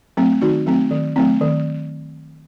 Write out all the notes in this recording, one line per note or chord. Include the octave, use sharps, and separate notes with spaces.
F#3 A3 C4
D#3 D#4 F#4
F#3 A3 C4
D#3
F#3 A3 C4
D#3